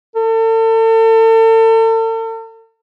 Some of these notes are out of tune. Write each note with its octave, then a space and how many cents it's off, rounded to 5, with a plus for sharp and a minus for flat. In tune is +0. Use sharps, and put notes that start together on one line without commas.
A4 +40